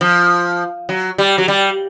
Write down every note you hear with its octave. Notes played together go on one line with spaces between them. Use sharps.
F3
F#3
G3
F#3
G3